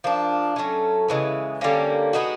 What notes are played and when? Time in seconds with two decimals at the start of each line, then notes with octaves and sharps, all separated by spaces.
0.04 F3 A#3 D4
0.56 F#3 A3 C#4
1.08 C#3 E3 G#3 B3
1.61 D3 G3 A#3 C#4
2.13 G#3 B3 D#4 F#4